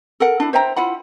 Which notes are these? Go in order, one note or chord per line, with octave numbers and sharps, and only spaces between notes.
A4 A#4 F#5
D4 E4
C5 E5 G5 A#5
E4 F4 F#5 B5